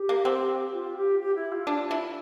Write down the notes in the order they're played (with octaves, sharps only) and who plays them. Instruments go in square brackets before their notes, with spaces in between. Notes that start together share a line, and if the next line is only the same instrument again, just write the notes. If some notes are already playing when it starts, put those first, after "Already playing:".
Already playing: [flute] G4
[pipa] A#3
C4
[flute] F4
G4
G4
E4
F4
[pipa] D4
E4